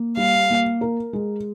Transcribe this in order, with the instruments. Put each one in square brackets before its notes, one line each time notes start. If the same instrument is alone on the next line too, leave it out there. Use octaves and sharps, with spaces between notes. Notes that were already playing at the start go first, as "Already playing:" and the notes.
Already playing: [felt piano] A#3
[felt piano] G3 [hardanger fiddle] F5
[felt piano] A#3
A#4
G#3